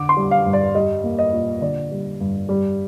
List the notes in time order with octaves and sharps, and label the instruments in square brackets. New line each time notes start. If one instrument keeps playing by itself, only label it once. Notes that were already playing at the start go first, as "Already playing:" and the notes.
Already playing: [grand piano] D3 D6
C6
G3
F5
G2
D5
G3 D#5
A#3
D#5
A#2
D3 D5
G3
G2
G3